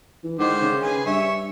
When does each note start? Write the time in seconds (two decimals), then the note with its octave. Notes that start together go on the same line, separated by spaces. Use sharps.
0.24 E3
0.39 G#2 D3 D#3 C5
0.62 C#3
0.82 G#4 B4
1.06 G2 C#5 E5